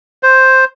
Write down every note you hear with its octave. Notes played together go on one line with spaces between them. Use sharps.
C5